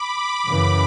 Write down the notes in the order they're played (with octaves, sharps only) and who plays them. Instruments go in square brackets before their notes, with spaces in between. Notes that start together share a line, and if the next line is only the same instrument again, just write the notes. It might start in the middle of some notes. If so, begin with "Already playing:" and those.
Already playing: [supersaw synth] B5 D6
[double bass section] F#2 C#3 E3